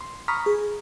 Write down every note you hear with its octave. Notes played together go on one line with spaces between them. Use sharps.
C6
A#5 B5 C#6 D#6 F6 B6
G#4